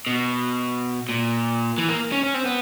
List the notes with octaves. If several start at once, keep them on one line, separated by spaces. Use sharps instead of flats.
B2
A#2
E3
A#3
C#4
C#4
C4
B3